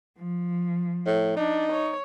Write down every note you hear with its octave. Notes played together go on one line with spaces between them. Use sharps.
F3
A2
D4 D#4
C#5